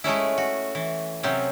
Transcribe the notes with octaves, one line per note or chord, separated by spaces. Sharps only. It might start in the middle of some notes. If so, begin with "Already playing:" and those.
G#3 A3 C#4 E4
F#4
E3
C3 F#3 C4 C#4